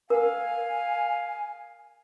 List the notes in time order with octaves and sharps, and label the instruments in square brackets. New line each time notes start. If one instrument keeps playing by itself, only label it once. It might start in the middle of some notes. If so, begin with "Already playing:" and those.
[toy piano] A#4 F#5 [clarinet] F5 [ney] G#5